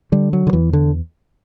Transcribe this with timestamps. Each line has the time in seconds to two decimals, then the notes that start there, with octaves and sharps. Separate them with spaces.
0.12 D3 G3
0.33 F#3
0.47 D3
0.53 E2 E3
0.73 D3